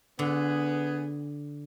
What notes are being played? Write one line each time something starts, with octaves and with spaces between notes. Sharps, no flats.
D3 B3 G#4